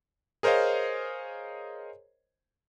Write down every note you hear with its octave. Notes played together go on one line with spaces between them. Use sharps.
G#4 A#4 C5 C#5 D#5 F5